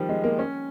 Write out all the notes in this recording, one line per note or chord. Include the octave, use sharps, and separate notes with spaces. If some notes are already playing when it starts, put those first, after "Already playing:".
Already playing: D#3 F3 G3
G#3
A#3
C#4